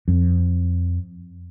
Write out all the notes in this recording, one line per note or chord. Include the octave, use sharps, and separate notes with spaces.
F2